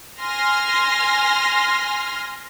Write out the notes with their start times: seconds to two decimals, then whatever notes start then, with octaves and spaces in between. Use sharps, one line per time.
0.21 G#5 C6 F6 A#6